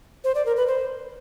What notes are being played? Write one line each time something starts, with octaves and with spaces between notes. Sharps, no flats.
C5
D5
A#4
B4
C5